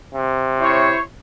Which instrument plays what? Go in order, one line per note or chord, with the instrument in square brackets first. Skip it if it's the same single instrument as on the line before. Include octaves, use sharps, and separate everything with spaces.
[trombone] C3
[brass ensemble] E4 C5 C#5